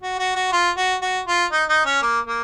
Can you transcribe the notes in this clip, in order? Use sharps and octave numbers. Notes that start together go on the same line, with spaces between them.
F#4
F#4
F#4
F4
F#4
F#4
F4
D#4
D#4
C#4
A#3
A#3